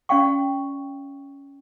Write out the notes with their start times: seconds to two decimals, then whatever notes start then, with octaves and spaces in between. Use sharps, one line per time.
0.09 C#4 D5 F5 G5 C#6